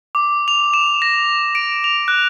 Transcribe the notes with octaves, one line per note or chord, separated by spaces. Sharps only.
D6
F7
E7
A#6
D7
F7
F#6